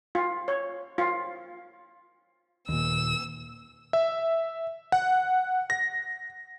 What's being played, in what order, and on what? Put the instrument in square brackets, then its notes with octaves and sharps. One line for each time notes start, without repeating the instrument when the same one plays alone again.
[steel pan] F4
C#5
F4
[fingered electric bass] D#2 A#2 [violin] E6
[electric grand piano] E5
F#5
A#6